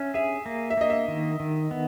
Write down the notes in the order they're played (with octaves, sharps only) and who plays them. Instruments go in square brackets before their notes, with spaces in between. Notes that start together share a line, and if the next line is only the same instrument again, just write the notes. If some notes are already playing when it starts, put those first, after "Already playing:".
Already playing: [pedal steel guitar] C#4 [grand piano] E5
[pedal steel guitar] G#4 [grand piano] E5
[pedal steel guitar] A#3
[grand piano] E5
[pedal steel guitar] A#3 [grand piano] D#5
[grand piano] E5
[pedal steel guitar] D#3
D#3
B3